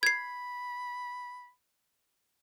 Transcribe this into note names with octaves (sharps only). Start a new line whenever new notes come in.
B5 G#6 C7